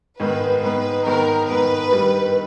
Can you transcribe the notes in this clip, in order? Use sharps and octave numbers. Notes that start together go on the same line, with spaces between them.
G#2 D#3 G#3 B3 B4
G#2 D#3 G#3 B3 B4
G#2 D#3 G#3 B3 A#4
G#2 D#3 G#3 B3 B4
G2 D#3 G3